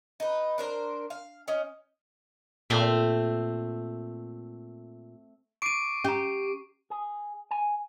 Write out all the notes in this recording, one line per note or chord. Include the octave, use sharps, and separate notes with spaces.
D#4 B4
D4 A#4 C5
F5
C#4 D#4
A#2 A3 C4 E5
C#6 D6 C7 D7 D#7
C#4 G4 A#5
G#4
G#5